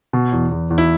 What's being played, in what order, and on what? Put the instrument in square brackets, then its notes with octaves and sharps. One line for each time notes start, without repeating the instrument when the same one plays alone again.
[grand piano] B2
E2
E2
E2
[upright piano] E4